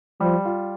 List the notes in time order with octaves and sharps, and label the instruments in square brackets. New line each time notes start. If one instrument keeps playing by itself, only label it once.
[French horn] F3 [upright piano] G3
[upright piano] F4